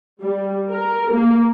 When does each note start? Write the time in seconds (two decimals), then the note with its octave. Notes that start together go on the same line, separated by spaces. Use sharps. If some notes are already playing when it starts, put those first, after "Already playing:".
0.21 G3
0.71 A#4
1.12 A#3